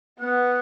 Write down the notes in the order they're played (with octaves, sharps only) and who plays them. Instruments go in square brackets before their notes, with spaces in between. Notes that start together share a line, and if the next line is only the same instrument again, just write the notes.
[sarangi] B3 [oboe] F#5